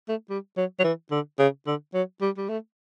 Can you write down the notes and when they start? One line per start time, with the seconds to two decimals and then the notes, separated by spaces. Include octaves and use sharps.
0.09 A3
0.30 G3
0.57 F#3
0.80 F#3
0.84 E3
1.11 D3
1.39 C#3
1.67 D3
1.94 F#3
2.22 G3
2.37 G3
2.49 A3